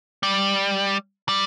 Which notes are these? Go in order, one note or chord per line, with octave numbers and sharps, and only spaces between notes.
G3
G3